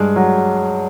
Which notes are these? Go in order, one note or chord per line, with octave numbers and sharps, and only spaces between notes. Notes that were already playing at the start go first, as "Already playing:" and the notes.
Already playing: G2 G#3
F#3